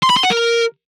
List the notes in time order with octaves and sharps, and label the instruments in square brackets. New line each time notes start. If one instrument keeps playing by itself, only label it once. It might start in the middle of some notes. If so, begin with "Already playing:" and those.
[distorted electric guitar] C6
B5
C6
F#5
A#4